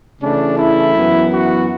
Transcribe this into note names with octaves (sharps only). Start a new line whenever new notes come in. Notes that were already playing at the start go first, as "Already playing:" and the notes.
C#3 E3 A3 D4
E4
F#2 E3 B3
F#4